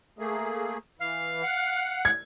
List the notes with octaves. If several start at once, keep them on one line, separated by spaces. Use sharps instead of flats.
A3 A#3 G#4
E3 F5
F#5
G#6